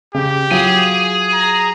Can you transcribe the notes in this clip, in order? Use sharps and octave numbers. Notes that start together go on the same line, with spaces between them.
C#3 G4
F#3 F4 G#4 G#5
A#5